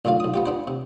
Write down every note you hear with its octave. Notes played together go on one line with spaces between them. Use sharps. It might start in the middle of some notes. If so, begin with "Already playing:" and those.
B1 A2 D3 F4 F5
B1 D#6
B3 F4 G4
B3 D4 C5
C3